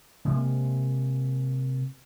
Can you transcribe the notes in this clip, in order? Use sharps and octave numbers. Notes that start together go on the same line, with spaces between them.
C3 G#3 A#3